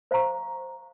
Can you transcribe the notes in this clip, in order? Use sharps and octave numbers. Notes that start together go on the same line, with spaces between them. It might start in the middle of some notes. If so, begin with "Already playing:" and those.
C5 F5 A#5 C#6